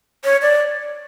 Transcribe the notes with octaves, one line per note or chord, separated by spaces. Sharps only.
C#5
D5